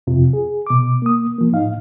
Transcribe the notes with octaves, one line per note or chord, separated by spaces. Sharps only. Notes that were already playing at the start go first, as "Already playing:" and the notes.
F2 C3 F4
G#4
B2 D6
A#3 D#6
F3 A#3
A2 D#4 F5